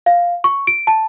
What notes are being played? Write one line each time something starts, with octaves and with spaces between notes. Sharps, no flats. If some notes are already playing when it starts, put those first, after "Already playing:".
F5
C#6
D7
A5